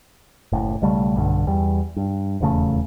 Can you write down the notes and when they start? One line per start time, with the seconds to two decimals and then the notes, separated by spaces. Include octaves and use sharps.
0.52 F#1 A2
0.82 B1 C#3 G3 A3
1.16 B1 G2 D3
1.47 E2 G3
1.96 G2
2.40 D#1 E2 C#3 A3